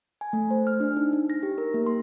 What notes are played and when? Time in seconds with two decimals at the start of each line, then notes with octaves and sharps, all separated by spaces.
0.21 G#5
0.33 A3
0.51 C5
0.67 F6
0.80 D4
0.97 D#4
1.13 D#4
1.30 A#6
1.43 G4
1.58 A#4
1.74 A#3
1.86 C6